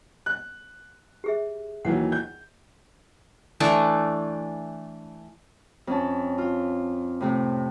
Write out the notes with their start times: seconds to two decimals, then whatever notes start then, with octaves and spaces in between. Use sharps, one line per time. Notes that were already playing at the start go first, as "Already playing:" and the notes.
0.26 F#6
1.24 G4 G#4 E5
1.85 D#2 E3 F#3 F#5
2.12 G6
3.60 E3 A3 D4
5.87 F2 C#4 A5
6.38 F4
7.20 A2 C3 A3